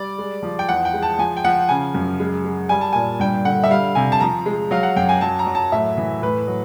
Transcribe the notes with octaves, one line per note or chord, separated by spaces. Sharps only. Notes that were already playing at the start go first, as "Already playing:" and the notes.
Already playing: G3 D5
G#3
F3
G5
E2 F#5
G5
G#3
A5
F3 G#5
G5
F3 F#5
C#3 G#5
F#2
G#3
G#3
G3 G#5
A5
A#2 G#5
G2 G5
D3 F#5
E5
G3 F5
C3 G#5
A5
F3 A#5
G#3
F#3 F5
F#5
F#2 G5
G#5
F#3 A5
A#5
F#3
A5
A2 E5
E3
A2 B4
F#3